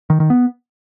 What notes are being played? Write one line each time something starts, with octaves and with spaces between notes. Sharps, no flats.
D#3
D#3
B3